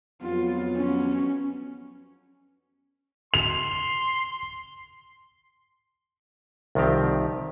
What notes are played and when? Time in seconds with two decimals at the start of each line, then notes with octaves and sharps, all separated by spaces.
0.22 F2 F#3 B3 F4
0.77 C#4
3.34 C6 F7
6.75 C2 D#3 F3 C4 G4